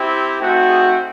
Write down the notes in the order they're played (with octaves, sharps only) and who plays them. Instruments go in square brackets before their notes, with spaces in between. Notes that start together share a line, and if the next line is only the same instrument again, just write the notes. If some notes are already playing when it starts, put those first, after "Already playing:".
Already playing: [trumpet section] C4 E4 G4
A3 C4 D#4 F#4
G#4